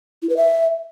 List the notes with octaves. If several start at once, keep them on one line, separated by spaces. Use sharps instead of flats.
E4
B4
E5